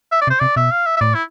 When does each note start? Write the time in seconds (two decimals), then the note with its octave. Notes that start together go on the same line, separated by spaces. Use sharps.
0.12 E5
0.21 D5
0.27 C3
0.30 C5
0.40 C3 D5
0.56 B2 E5
0.72 F5
0.86 E5
0.97 E5
1.01 A2 D5
1.15 E4